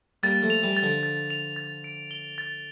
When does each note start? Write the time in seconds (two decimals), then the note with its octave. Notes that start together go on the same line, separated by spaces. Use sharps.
0.23 G3 A#3 A6
0.42 F3 A3
0.50 F7
0.63 E3 G3
0.77 A6
0.83 D3 F3
1.03 A6
1.30 F7
1.56 A6
1.84 D7
2.11 G7
2.38 A6